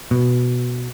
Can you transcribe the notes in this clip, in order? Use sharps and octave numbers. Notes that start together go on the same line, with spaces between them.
B2